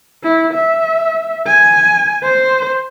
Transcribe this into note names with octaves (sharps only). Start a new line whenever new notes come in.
E4
E5
G#5
C5